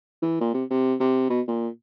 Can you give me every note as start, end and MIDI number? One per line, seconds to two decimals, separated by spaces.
0.22 0.37 52
0.41 0.52 46
0.54 0.64 48
0.70 0.95 48
1.00 1.26 48
1.30 1.41 47
1.47 1.68 46